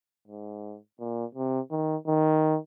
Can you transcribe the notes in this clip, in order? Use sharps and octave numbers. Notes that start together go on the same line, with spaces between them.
G#2
A#2
C3
D#3
D#3